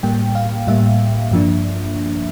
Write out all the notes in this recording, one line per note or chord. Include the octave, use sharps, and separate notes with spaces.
A2 G3 A#3 G5
F5
A2 G3 A#3 E5
G2 F3 A#3 D4